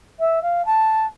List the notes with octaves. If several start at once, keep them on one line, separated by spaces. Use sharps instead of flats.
E5
F5
A5